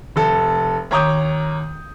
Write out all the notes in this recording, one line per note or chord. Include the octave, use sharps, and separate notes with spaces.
F1 A4
D#2 C#5 A#5 D6 D#6 G6